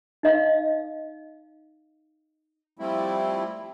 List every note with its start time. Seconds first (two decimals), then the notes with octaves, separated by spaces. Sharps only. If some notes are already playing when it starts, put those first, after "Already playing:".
0.23 D#4 D#5 F5
2.79 F3 G3 A3 C4 E4